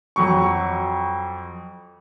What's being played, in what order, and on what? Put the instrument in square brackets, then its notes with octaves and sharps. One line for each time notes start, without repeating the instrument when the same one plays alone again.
[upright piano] F2 F#3 C#6